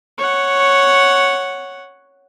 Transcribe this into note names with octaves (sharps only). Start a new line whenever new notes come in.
C#5 F#5